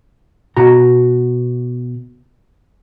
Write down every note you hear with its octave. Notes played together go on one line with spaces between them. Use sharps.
B2 F#4 A#5